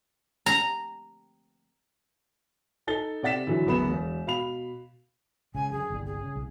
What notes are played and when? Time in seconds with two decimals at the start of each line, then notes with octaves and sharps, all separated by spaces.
0.46 A#5
2.87 D#4 A4 A6 G7
3.23 C3 D5 F#5 A6 B6 E7
3.47 D3 E3 F#3
3.66 F#1 D2 B3 B5 E7
3.89 E1
4.27 B2 F5 B5 F7
5.55 C#2 C#3 G#5
5.71 F#2 D3 G#4
5.90 G1 C2 G3
6.06 G#4
6.21 C#3
6.36 C2